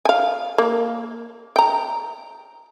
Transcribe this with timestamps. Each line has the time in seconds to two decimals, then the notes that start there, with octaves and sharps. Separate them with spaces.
0.05 F5 G#5
0.58 A#3
1.56 G5 A#5